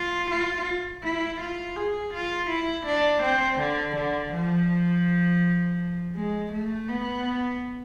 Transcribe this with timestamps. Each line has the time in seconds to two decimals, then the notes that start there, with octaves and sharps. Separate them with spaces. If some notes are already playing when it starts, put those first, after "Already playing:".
Already playing: F4
0.30 F4
1.03 E4
1.41 F4
1.76 G#4
2.14 F4
2.50 E4
2.86 D4
3.23 C4
3.59 D3
3.96 D3
4.33 F3
6.15 G#3
6.52 A3
6.88 B3